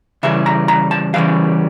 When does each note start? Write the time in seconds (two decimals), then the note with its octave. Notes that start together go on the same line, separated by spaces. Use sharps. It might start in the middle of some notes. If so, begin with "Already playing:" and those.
0.23 C#3 E3 G3 E5
0.46 A#5
0.68 A#5
0.91 A5
1.14 C#3 E3 G3 F5